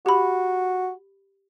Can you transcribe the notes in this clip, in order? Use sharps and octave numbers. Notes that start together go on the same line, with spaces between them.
F#4 G4 B5